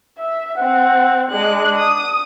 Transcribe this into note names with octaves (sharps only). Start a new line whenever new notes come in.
E5
C4 F#5
G#3 D4 F#6
D#6